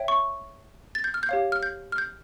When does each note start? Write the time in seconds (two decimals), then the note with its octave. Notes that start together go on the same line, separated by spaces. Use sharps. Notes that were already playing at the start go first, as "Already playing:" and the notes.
Already playing: C#5 E5 G5
0.08 C#6
0.95 A6
1.04 G6
1.14 F6
1.23 G6
1.29 G4 C#5 F5
1.52 F6
1.63 G6
1.92 F6
1.98 G6